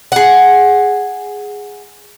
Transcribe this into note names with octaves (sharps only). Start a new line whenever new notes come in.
G#4 F#5